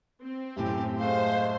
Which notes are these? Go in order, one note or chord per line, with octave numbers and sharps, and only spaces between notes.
C4
F#2 A2 G4
G#3 A3 C5 F5